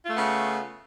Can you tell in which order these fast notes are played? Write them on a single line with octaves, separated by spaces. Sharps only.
F4 A3 B3 C#3